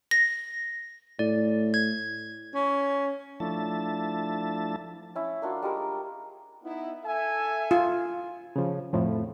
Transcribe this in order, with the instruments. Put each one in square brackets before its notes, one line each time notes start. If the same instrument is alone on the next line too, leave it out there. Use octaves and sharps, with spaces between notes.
[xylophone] A#6
[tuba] A2 [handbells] D5
[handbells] G#6
[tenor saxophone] C#4
[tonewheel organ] F3 A3 D4 E4 A5
[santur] C#4 E4
A#3 D4 F4 F#4
G3 G#3 F4 A#4
[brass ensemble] B3 D#4 E4
A4 E5 G#5
[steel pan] F4
[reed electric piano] C#3 F3
F2 A2 F3